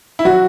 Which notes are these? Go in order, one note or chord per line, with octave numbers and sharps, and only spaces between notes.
E4
F#3 F#4